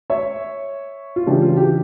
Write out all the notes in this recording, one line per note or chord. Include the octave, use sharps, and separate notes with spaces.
C#5 E5
F4
C#3 E3 G3 D4 G4
F4
G4